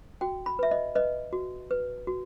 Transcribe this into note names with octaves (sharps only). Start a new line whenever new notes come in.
F#4 G5
B5
B4 E5
D#5
B4 D#5
F#4
B4
F#4